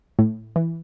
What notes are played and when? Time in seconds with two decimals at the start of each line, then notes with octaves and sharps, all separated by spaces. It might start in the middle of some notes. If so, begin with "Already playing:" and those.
0.19 A2
0.56 E3